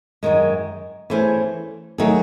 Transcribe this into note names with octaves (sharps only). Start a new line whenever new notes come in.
F#2 D#3 G#3
E3 A3 C#4 G#4 C5
D#3 F#3 A3 D#4 G#4